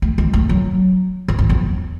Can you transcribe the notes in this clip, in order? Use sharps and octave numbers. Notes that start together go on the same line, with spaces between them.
A3
G#3
A3
F#3
E3
F#2
E2